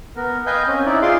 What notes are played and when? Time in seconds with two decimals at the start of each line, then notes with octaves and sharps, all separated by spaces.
0.16 B3 A#4
0.46 B4 D#5 F5 G5 G#5 G6
0.67 C4 C#4
0.86 D#4 E4 D5
1.02 F4 G#4 F5 C6 D6